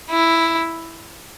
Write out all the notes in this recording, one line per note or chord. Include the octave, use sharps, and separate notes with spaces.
E4